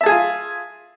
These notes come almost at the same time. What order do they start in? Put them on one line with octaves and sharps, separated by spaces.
E5 A5 G#4 G#5 F4